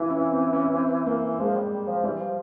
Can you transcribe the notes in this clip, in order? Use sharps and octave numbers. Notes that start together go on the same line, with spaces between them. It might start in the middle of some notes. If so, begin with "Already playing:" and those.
Already playing: E3 E4 F4
C#4
C4
C#4
C4
A#3
F3 G#3
G3
G3
F3
E3 G3
F3